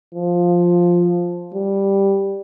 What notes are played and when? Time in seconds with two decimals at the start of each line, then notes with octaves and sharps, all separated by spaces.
0.14 F3
1.54 G3